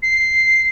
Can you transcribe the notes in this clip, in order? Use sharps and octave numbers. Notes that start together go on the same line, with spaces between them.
C7